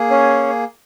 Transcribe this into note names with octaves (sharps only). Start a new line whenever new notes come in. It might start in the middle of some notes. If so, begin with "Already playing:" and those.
Already playing: A#3 G#4
C#4 C#5